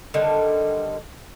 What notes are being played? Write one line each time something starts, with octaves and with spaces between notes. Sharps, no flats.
D3 D#3 G3